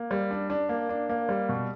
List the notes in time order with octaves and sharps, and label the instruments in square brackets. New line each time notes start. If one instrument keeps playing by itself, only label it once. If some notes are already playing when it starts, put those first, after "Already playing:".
Already playing: [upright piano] A#3
G3
D4
D4
A#3
D4
A#3
G3
B2